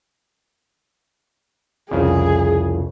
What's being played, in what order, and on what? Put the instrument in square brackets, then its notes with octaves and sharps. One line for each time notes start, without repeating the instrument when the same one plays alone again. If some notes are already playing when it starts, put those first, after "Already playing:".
[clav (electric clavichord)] C2 F2 C#3 [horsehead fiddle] G#4